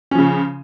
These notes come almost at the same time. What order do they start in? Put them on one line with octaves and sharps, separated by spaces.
C#4 F3 C#3